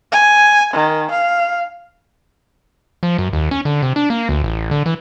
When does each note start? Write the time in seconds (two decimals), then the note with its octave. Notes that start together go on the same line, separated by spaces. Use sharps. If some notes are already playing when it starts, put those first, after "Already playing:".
0.12 G#5
0.74 D#3
1.11 F5
3.03 F3
3.18 F#2
3.33 D#2
3.51 C#4
3.65 D3
3.82 C3
3.96 D4
4.10 A#3
4.29 D2
4.44 A1
4.71 D3
4.86 E3